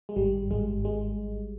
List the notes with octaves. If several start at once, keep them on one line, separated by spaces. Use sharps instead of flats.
G#3
G#1 G3
G#1 G#3
G#3